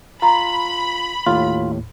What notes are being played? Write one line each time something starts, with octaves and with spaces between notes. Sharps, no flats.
F4 A#5 B5
D#2 A2 F4